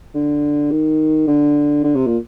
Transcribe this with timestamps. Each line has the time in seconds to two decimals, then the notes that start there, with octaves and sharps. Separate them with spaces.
0.15 D3
0.71 D#3
1.28 D3
1.84 D3
1.95 C3
2.06 A#2